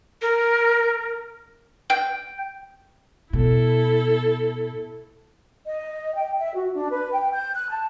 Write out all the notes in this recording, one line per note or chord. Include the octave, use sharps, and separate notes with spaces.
A#4
G5
B2 E4 A4
D#5
G5
E5
F#4
D4
B4
G5
G6
F#6
A5